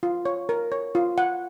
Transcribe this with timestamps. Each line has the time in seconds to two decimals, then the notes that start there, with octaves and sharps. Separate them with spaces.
0.03 F4
0.25 C#5
0.49 A#4
0.72 C#5
0.95 F4
1.18 F#5